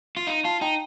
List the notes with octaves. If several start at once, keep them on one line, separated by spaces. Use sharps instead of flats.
F4
D#4 F5
F4 F5 A5
D#4 G5 A#5